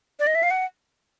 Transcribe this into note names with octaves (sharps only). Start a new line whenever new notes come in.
D5
D#5
E5
F5
F#5